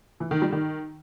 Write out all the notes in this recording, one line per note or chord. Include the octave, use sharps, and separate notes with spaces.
E3
D#3
G3
D#3